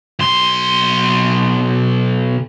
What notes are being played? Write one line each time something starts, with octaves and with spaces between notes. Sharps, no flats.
B1 C6